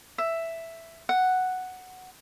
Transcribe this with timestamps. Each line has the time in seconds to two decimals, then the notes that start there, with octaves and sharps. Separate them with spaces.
0.18 E5
1.09 F#5